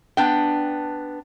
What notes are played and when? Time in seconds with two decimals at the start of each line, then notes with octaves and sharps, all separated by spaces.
0.17 B3 D4 G5